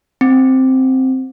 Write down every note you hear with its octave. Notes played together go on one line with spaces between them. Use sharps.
C4